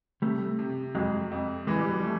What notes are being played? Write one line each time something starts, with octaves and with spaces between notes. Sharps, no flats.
C3 G3 A3
C3
F2 F#3 G#3
F2
E3 G#3
G3
F#3
F3 G3 A3